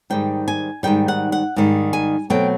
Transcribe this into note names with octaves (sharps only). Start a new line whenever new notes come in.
G#2 D#3 G3 G5
G#5
G#2 D#3 G3 G5
F#5
F#5
G#2 D#3 G3
G#5
B2 F#3 A3 C4 G5